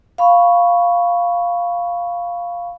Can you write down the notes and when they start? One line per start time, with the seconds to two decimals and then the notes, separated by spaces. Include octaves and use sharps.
0.18 F5 B5 C#6